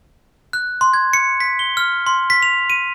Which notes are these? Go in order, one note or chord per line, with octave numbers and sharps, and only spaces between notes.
F#6
C6
G#6
C#7
B6
G7
F6
C6
B6
F7
D#7